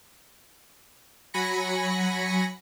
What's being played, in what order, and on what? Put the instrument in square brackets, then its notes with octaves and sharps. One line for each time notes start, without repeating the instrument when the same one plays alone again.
[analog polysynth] F#3 G#5 B5 A#6 C#7